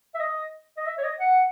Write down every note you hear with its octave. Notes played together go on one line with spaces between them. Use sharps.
E5
D#5
D#5
E5
C#5
D#5
F#5